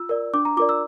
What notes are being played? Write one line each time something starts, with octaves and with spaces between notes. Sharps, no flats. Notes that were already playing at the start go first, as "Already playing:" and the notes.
Already playing: F4 E6
A#4 D5
D4 D6
A#5
F4 A#4 D5 D6
E6